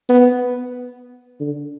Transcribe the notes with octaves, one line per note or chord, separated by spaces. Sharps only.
B3
D3